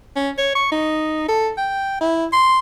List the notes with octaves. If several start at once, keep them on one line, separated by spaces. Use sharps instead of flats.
C#4
C#5
C#6
D#4
A4
G5
E4
C6